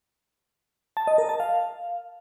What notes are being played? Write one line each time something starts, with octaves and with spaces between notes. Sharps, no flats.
A5
D#5
A#4
A5
F5